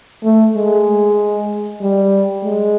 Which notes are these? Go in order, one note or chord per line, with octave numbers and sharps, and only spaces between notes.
A3
G#3
G3
G#3